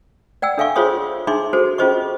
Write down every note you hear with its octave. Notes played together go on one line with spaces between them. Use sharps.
D5 F#5 G5 E6
D4 A4 E5 F5 G#5 C#6
F4 G#4 C5 C#5 C6 D#6
D4 D#4 G#4 E5 C6 D6
F#4 G#4 A4 C5
C#4 F4 G#4 C5 D#5 C#6